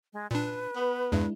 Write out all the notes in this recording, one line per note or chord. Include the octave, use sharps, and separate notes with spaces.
G#3
A#2 D4 B4
B3
E2 G2 G#3 D4 E4